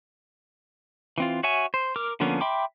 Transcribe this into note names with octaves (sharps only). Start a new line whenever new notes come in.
E3 C4 F4
F#4 C#5 E5 G#5
C5
A#4 D6 F6
D3 F3 A#3 B3 C#4
E5 G5 B5 C6 D6